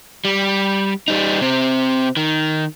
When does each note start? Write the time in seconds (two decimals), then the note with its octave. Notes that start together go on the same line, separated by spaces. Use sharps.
0.25 G3
1.08 G3 D#4
1.41 C3 C4
2.17 D#3